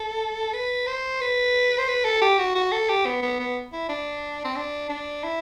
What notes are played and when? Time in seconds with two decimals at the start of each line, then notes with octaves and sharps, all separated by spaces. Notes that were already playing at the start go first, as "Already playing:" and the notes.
Already playing: A4
0.53 B4
0.87 C5
1.21 B4
1.78 C5
1.88 B4
2.04 A4
2.22 G4
2.38 F#4
2.55 F#4
2.72 A4
2.89 G4
3.06 B3
3.23 B3
3.39 B3
3.73 E4
3.89 D4
4.45 C4
4.56 D4
4.89 D4
5.24 E4